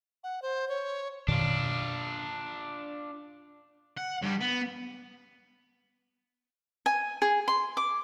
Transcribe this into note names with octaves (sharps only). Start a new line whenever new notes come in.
F#5
C5
C#5
F#2 B2 D#3 D4 F4
F#5
G2 G3
B3
G#5
G#4
C6
D6